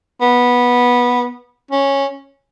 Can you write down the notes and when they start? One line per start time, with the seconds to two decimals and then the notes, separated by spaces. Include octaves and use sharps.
0.21 B3
1.71 C#4